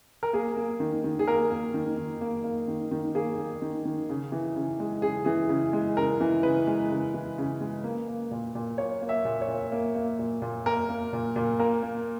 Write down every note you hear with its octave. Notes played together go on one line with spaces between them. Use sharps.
A#4
A#3 G#4
A#3
D#3
D#3
G#4
A#3 A#4
A#3
D#3
D#3
A#3
A#3
D#3
D#3
A#3 G#4
A#3
D#3
D#3
C#3
E3
C#3
G#3
C#3 G#4
E3 G#4
C#3
G#3
C#3 A#4
E3
C#3 B4
G#3
C#3
E3
C#3
G#3
A#3
A#3
A#2
A#2
A#3 C#5
A#3
E5
A#2
C#5
A#2
A#3
A#3
A#2
A#2
A#3 A#4
A#3
A#2
A#2
A#3 A#4
A#3